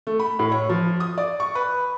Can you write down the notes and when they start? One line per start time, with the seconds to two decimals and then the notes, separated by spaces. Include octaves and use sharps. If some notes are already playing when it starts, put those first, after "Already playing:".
0.07 A3
0.20 B5
0.39 A2
0.52 C#5
0.69 F3
1.00 D#6
1.18 D5
1.40 C#6
1.55 B4